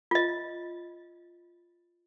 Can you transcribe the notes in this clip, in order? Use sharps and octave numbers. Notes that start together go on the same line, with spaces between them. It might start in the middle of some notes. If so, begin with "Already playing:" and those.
F4 D#5